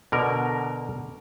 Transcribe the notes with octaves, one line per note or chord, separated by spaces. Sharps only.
B2 D3 A#4